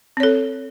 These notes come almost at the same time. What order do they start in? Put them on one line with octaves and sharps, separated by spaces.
C4 C#5 A4